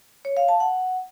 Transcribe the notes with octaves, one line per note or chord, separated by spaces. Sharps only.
C#5
F5
A5
F#5